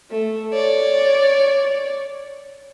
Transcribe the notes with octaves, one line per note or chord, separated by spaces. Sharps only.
A3
C#5 D5